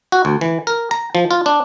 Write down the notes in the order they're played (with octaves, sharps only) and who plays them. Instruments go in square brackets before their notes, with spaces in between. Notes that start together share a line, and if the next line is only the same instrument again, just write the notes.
[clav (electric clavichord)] F#4
D2
E3
A#4
A#5
F3
F4
D4